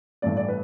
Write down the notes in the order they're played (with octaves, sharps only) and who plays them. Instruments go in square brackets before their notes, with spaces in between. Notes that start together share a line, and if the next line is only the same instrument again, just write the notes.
[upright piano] A1 G2 E3 A3 D5
D5
B4